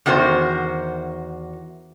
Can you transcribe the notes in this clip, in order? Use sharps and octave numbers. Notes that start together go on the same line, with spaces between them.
E2 D#3 F#4 A#4 C5